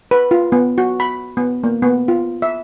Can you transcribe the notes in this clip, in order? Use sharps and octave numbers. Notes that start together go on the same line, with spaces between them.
B4
F4
B3
F#4
B5
B3
A#3
B3
F4
E5